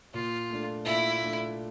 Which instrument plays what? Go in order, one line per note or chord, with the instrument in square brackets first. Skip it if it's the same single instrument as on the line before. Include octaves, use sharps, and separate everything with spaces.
[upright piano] A#2 [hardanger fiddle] F4
[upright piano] A3 D4
[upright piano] A#2 [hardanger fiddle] E4
[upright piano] A3 D4